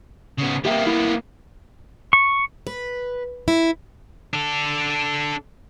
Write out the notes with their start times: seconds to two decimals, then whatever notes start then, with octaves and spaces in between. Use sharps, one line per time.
0.39 C#3 B3
0.65 A#3 B3 G4 E5 G5
0.87 E4
2.13 C#6
2.67 B4
3.48 E4
4.33 D4 A4